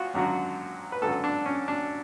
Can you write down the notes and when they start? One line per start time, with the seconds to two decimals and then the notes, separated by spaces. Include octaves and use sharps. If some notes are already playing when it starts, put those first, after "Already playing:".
Already playing: G#1 F4 F#4
0.14 G#1 F#2 D3 F#3
0.92 B4
1.02 G#1 F#2 D3 F#3 A4
1.24 D4
1.46 C#4
1.68 D4